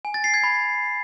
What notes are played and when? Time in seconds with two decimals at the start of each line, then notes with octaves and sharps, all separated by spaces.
0.05 G#5
0.14 A6
0.24 C7
0.34 G#6
0.44 B5